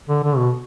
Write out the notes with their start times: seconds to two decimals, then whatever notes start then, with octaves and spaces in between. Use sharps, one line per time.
0.09 D3
0.23 D3
0.37 B2